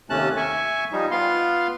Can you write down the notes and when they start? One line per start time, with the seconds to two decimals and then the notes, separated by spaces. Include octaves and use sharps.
0.10 D#2 C3 A3 C#4 A5 F#6
0.37 E5 G#5 C#6
0.92 F3 G3 D#4
1.11 B3 F4 F5 C6